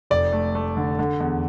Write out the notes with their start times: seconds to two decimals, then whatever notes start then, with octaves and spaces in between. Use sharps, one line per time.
0.10 F1 D5
0.33 A3
0.55 A3
0.77 D3
0.99 D3
1.20 E2